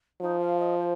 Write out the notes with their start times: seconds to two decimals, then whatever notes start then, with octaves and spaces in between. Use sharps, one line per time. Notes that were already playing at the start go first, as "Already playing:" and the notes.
0.21 F3 D#4
0.40 F5
0.59 D#5
0.78 C5